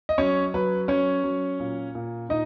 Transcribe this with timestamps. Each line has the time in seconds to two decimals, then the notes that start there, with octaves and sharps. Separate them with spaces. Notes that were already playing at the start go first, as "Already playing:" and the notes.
0.09 D#5
0.18 F#3 C#4 C#5
0.54 F#3 B4
0.88 F#3 C#4 C#5
1.23 F#3
1.60 A#2
1.95 A#2
2.29 A#2 D#4 D#5